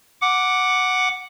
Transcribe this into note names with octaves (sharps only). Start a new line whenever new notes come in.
F#5 D6